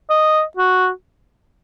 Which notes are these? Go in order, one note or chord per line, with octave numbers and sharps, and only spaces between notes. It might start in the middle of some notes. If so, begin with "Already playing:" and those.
D#5
F#4